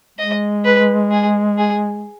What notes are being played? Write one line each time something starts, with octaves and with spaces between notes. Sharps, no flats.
G#3 D#5
B4
G#4
G#4